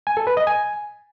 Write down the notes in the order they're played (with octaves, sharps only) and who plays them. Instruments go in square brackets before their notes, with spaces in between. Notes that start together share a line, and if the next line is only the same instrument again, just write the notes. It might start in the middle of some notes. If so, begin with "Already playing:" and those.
[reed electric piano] G#5
A4
B4
D#5
G#5